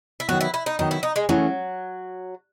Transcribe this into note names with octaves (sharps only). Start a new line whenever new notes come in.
E4
D#3 F#3 B3 F#4
E4
E4
D#4
D#3 F#3 B3 D#4
E4
D#4
G#3
E3 F#3 A3 C#4 E4 G#4